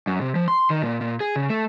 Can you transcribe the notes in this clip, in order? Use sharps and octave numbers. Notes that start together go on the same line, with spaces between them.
F#2
C3
F3
C6
D#3
A#2
A#2
G#4
C#3
A3